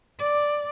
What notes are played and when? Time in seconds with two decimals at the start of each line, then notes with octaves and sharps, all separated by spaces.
0.20 D5